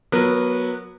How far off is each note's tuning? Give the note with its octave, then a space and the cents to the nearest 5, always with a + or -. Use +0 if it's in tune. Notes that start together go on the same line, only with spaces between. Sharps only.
F#3 -10 B3 -20 A#4 +0